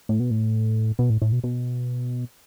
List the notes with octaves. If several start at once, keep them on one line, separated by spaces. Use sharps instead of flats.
A2
B2
A2
B2
A2
A2
B2
B2